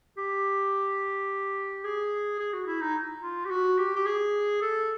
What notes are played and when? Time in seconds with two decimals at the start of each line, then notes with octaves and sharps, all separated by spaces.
0.18 G4
1.84 G#4
2.39 G#4
2.53 F#4
2.67 E4
2.81 D#4
3.22 F4
3.45 G4
3.50 F#4
3.78 G4
3.96 G4
4.06 G#4
4.62 A4